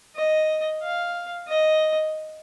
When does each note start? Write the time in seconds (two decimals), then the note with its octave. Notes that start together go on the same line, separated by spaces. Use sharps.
0.16 D#5
0.82 F5
1.48 D#5